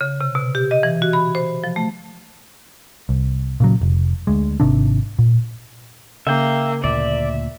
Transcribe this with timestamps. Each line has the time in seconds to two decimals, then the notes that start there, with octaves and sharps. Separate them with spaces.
0.01 C#3
0.21 C3
0.35 B2
0.55 G4
0.71 D#5
0.83 E3
1.02 F#4
1.13 B5
1.35 C5
1.64 F3
1.76 A3
3.09 C2
3.60 A#2 C#3 F#3
3.81 F1
4.27 D2 G#3
4.60 G#1 C3 D#3 D4
5.19 A#2
6.27 C#3 A#3 E5 G5
6.84 D2 A#2 D5 E5